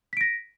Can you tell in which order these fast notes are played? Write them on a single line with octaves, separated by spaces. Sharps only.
B6 D7 A#6